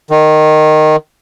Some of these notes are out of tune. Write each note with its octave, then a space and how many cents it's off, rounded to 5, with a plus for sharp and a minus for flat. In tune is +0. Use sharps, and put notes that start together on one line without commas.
D#3 -10